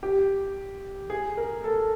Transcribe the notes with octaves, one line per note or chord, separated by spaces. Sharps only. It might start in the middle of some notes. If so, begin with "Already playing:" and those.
G4
G#4
A#4
A4